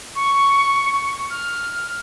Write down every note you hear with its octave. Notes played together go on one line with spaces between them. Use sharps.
C#6
F6